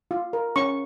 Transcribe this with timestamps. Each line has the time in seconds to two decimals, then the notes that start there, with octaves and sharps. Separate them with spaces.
0.11 F4
0.33 A#4
0.56 C#4 C#6